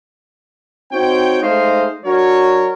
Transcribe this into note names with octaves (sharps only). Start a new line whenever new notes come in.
C4 D#4 F#4 C#5 G5
G#3 A3 D#4 C5 D#5 F5
F#3 D4 F#4 A#4 C#5